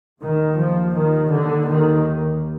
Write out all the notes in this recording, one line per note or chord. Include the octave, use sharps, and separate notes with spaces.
D#2 D#3
F3
D#3
D3
D#3